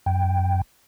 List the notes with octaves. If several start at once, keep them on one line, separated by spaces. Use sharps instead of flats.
F#2 G5